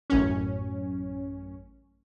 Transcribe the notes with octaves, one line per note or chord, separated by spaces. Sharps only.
A1 F#2 C#4